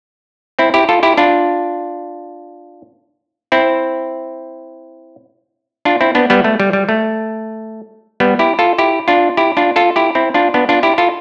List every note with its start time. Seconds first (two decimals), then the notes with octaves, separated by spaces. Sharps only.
0.59 C4 E4
0.74 E4 G4
0.89 F4 A4
1.03 E4 G4
1.18 D4 F4
3.52 C4 E4
5.85 D4 F4
6.01 C4 E4
6.15 B3 D4
6.30 G3 B3
6.44 A3
6.60 G3
6.73 G3
6.89 A3
8.20 G3 B3
8.39 E4 G4
8.59 F4 A4
8.78 E4 G4
9.08 D4 F4
9.37 E4 G4
9.57 D4 F4
9.76 F4 A4
9.96 E4 G4
10.15 C4 E4
10.34 D4 F4
10.54 B3 D4
10.69 D4 F4
10.83 E4 G4
10.98 F4 A4